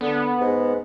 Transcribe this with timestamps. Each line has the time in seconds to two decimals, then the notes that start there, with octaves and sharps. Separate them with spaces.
0.01 D3 B3
0.41 G#2